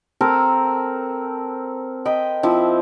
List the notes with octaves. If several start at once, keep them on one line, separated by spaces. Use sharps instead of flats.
C4 A4 A#4
D#5 G5 B5
F3 C4 E4